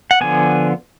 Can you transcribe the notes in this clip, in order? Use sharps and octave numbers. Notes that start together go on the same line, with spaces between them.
F#5
D3 F3 B3 G#5